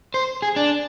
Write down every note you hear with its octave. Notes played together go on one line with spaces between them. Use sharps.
C5
G#4
D4